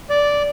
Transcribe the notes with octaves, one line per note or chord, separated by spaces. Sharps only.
D5